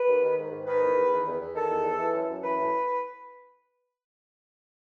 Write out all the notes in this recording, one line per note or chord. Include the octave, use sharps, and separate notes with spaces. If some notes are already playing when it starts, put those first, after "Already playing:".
Already playing: B4
D#2
D#3
G#2
G#2
D#3 B4
E2
E2
D#3
E2
E2
D#3 A4
E2
E2
E3
F#2
F#2
E3 B4
A2